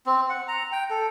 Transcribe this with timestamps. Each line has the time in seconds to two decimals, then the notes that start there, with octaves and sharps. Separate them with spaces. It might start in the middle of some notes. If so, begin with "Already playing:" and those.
0.06 C4
0.30 F#5
0.48 A#5
0.72 G5
0.90 A4